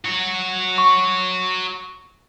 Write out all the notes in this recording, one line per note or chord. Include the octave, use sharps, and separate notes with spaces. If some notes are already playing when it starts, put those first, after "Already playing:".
F#4 C#5
C#6